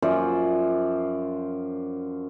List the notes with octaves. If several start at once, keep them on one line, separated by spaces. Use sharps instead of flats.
F#2 F3 C5 D5